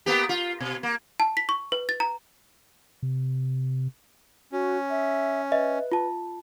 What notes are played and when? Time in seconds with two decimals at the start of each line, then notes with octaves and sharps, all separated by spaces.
0.06 A#3 B3 G4
0.29 F4
0.60 B2
0.83 A#3
1.20 A5
1.37 B6
1.49 C#6
1.72 B4
1.89 A6
2.00 A#5
3.03 C3
4.52 C#4 F#4
4.90 E5
5.52 B4 D#5 E5
5.92 F4 A5